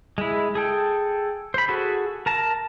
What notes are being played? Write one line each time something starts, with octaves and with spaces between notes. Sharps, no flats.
G#3 E4
G#4 A4 G5
C5 B5
F#4 G#4 A4
A#4 A5 A#5